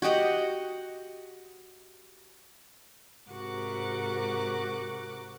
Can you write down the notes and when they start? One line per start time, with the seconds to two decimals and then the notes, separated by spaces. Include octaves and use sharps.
0.02 F#4 G4 D#5 F#5
3.29 G#2 C3 F#4 A#4 D6 F#6